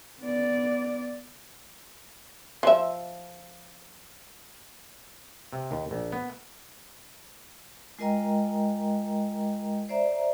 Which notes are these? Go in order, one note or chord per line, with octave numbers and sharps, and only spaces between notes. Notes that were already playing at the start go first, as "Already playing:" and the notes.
B3 D5
F3 E5
C3
D#2
A#1
B3
G#3 F4 A#4 D#5 G5 A#5
C5 D5 E5 A#5